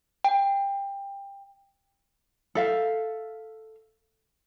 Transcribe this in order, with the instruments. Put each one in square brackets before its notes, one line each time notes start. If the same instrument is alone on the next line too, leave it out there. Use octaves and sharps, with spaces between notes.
[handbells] G5
[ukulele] A4 E5 F5